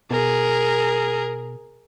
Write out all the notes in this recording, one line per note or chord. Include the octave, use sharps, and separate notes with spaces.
B2 G#4 A#4